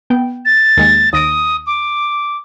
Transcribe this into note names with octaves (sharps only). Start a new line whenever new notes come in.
B3 G5
A6
D#2 G#3
D#2 D#6 A#6 D7
D6